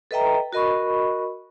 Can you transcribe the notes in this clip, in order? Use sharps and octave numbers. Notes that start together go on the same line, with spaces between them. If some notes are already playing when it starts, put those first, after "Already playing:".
A4 B4 D#5 E5 G5 A#5
F#4 A#4 D#5 B5 C#6